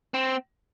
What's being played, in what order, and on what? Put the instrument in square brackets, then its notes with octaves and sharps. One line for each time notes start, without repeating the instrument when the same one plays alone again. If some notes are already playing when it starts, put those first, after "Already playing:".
[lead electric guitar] C4